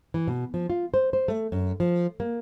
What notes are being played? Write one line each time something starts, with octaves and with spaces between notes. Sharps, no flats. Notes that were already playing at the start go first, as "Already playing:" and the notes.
E3
B2
F3
F4
C5
C5
A3
F#2
F3
A#3